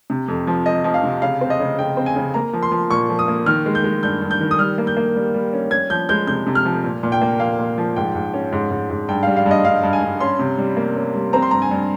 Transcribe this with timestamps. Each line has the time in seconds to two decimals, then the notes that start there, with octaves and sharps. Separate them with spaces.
0.10 C3
0.28 F2
0.47 F3
0.66 F3 D#5
0.84 F3
0.94 F5
1.03 C3
1.22 C#3 F5
1.41 C4
1.50 D#5
1.60 C#3
1.78 C#3 G5
1.97 C4
2.06 G#5
2.16 C#3
2.34 A#3 A#5
2.53 F3
2.63 C6
2.72 F3
2.91 A#2 C#6
3.09 F3
3.19 D#6
3.28 A#3
3.46 D#3 F6
3.66 G#3
3.75 G6
3.84 G#3
4.03 G2 G6
4.21 G2
4.31 G6
4.41 D#3
4.51 D#6
4.59 G3 F6
4.78 A#3
4.87 G6
4.97 A#3
5.16 G3
5.34 G3
5.53 C#4
5.71 C#4 G#6
5.90 F3 G6
6.09 G#3 G6
6.27 C3 G6
6.47 C3
6.55 F6
6.65 F3
6.84 A#2
7.03 A#2
7.12 G5
7.22 A#3
7.40 A#2 F5
7.59 A#2
7.78 F3
7.96 G#2 G5
8.15 G#2
8.34 C#4
8.52 G#2
8.71 G#2
8.90 G#2
9.09 G2 G5
9.23 G3 F5
9.37 F5
9.46 G2
9.51 D#5
9.64 G2 F5
9.83 G2
9.93 G#5
10.03 G2
10.20 C#4 C6
10.39 C3
10.58 G3
10.77 A#3
10.96 C#4
11.15 G3
11.33 C4 A#5
11.42 C6
11.51 G2 A#5
11.62 G#5
11.71 G2